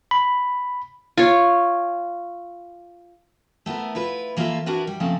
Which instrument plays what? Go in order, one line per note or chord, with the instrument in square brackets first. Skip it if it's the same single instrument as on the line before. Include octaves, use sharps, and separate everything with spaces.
[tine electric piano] B5
[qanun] F4 C#5
[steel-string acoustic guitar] A3 B3 E4 A#4
E4 F4 B4
E3 A#3 E4 F4 A4 E5
D4 E4 F#4 A#4 B4
G3
C#3 F3 A3 A#3 C4